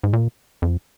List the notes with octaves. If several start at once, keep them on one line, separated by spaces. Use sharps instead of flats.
G#2
A#2
F2